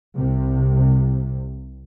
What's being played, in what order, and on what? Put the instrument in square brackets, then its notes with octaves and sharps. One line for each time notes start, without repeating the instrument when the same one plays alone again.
[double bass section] C2 C3